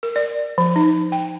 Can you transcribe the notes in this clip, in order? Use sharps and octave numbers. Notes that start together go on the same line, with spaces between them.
A#4
D5
F3
D#4
G5